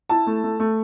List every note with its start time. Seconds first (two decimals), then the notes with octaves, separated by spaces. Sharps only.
0.09 E4 A5
0.27 A3
0.44 A3
0.60 A3